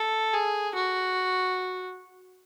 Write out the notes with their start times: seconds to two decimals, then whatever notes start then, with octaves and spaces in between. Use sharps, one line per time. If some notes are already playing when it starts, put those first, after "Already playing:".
Already playing: A4
0.34 G#4
0.75 F#4